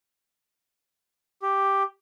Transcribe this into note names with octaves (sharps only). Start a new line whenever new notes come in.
G4